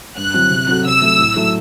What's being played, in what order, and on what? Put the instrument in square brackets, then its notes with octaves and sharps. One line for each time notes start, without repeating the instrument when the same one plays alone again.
[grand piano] G2 [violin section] F#6
[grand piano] D3 F#3 C4 E4
C3
F#3 C4 F#4 A4
[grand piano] C3 [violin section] E6
[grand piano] F#3 A3
A2
F#3 A3 E4 A4